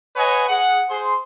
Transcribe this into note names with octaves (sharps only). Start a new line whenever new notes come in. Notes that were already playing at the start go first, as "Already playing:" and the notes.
B4 C#5 D#5 F#5 G#5
G#4 F#5
G#4 C5 C6